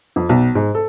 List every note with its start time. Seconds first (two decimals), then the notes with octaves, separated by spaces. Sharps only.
0.16 F2
0.29 B1
0.55 G#2
0.75 A4